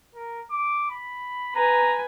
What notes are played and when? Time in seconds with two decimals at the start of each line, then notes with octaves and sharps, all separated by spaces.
0.15 A#4
0.51 D6
0.91 B5
1.56 B4 G#5 A#5